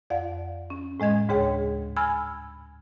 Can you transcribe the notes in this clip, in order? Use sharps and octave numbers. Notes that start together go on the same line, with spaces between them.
F2 D5 F5 F#5
C#4
A2 G#3 D#5 G#6
D2 G#2 C#3 G#4 C#5 G5
G#5 B5 E6 F6 G#6